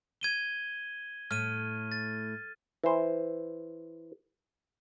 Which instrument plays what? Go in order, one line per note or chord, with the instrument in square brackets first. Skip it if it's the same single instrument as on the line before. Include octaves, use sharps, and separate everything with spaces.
[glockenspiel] G#6 D#7 G7
[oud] A2 [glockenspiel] F6 D#7
[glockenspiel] A6
[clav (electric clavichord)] E3 C5